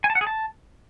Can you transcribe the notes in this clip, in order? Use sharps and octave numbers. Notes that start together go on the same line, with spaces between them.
G#5
A5
F#5
G#4
A5